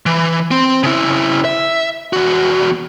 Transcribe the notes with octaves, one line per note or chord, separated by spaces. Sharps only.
E3
C4
C#3 E4
E5
E2 F#4